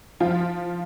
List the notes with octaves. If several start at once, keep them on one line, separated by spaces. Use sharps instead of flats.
F3 F4